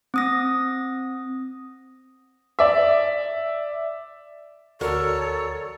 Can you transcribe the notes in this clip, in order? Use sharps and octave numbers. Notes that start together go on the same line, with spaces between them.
C4 D#6 A#6
D5 E5
D2 F#4 A4 A#4 C#5 D5